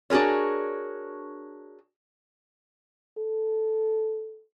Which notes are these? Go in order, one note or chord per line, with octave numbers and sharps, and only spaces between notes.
D4 F#4 G#4 A#4 C#5
A4